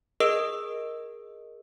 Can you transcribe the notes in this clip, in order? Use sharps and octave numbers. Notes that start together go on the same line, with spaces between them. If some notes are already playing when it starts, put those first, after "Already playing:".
G#4 A#4 D#5 E6 D7